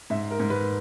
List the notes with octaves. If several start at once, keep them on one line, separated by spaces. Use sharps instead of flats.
G#2 E5
A#4
G#2
B4